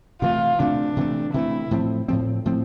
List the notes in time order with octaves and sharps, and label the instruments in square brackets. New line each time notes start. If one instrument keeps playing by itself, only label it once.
[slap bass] C3 E3 A3 [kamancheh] F4
[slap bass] C3 E3 A3 [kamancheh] D4
[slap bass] C3 E3 A3
[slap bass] C3 E3 A3 [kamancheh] E4
[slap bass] A2 F3 C4
A2 F3 C4
A2 F3 C4